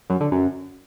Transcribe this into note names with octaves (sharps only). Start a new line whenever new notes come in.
F#2
D3
F#2